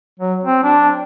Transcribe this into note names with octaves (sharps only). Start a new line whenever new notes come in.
F#3
C4
D4